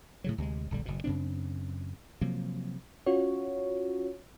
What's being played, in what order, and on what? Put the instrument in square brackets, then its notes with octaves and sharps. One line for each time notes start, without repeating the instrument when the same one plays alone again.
[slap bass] A2 C#3 F#3
D2 C3 F#3 G#3
D1 A#1 D3 G3
F#1 B2
F#2 C#3 C4 D4
C3 F3 F#3 A#3
[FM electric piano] C#4 F4 F#4 C#5